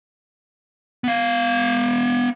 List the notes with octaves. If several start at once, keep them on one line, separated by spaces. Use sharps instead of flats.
B3 F5